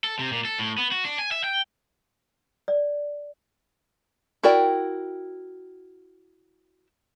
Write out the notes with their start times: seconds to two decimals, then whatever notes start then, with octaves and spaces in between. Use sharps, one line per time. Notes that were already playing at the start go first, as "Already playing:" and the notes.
0.04 A4
0.19 C3
0.32 A#2
0.45 A4
0.59 A2
0.78 B3
0.92 F#4
1.05 D4
1.19 G#5
1.31 E5
1.44 G5
2.68 D5
4.43 E4 F#4 A#4 D5 G5